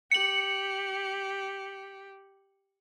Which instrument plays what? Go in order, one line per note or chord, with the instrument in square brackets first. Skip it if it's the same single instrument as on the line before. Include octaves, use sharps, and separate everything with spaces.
[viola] G4 [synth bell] C#7 F#7